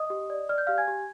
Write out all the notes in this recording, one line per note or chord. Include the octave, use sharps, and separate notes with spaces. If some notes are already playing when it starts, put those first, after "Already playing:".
Already playing: D#5 D#6
G4
D5
D5 F6
G6
G4 F5 F6
G#5 G#6
G4